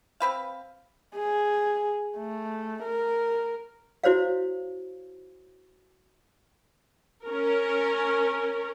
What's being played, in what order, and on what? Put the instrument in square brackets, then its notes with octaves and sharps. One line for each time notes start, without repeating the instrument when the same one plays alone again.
[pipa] C4 B4 F5
[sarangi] G#4
A3
A#4
[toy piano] E4 F#4 C5 C#5 F5
[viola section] C#4 A#4